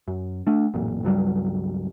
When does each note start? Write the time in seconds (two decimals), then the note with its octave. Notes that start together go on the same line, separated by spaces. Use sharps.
0.08 F#2
0.47 A3 D4
0.74 A1 F#2 A#2
1.03 C#2 G2 F#3 G3